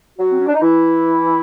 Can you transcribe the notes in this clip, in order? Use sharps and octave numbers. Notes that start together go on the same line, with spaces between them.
F#3 F#4
C4
C#4
D4
D#4
E3 E4